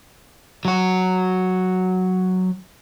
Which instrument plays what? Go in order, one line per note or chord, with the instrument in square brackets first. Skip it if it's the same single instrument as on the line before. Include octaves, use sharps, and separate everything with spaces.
[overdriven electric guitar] F#3 F#4